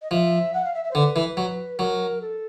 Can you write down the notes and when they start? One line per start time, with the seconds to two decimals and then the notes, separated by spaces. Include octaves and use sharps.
0.01 D#5
0.11 F3 E5
0.53 F#5
0.64 F5
0.74 E5
0.84 E5
0.91 C5
0.95 D3 B4
1.16 E3
1.37 F#3
1.79 F#3 A#4
2.21 A4